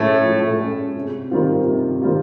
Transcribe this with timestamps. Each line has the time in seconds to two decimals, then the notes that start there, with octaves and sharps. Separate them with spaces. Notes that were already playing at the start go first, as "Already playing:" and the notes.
Already playing: A2 G#3 A3 C#4
0.24 F3
0.60 G#3 C#4
0.95 C3
1.31 D#3 G3 C4 F4
1.67 C3
2.02 D#3 G3 C4 F4